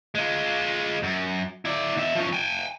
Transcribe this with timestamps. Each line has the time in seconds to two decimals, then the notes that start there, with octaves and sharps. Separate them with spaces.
0.15 G#3 F4
1.03 F#2
1.65 E4 D5
1.97 B2 E5
2.15 F3 C#4
2.33 G5 G#5